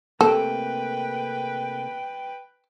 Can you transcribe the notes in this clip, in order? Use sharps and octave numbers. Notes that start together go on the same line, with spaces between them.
C3 A3 A#3 A4 B4 G5